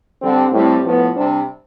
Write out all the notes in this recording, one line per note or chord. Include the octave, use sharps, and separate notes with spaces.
D3 G3 C4
A2 G3 C4
A2 F3 B3 B4
C3 G3 D4 C5